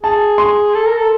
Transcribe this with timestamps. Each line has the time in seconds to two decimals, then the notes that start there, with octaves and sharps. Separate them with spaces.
0.03 G#4 A5
0.38 C6
0.74 A4
0.86 A#4
0.97 A4